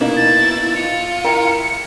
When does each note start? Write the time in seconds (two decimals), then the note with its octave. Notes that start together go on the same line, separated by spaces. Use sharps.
0.01 B2 A#3 D#4 E4
0.16 A6
0.76 F4 C#7
1.24 E4 A#4 G5